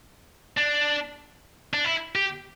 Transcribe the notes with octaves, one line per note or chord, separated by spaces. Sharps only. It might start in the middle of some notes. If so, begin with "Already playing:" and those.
D4
D4
E4
G4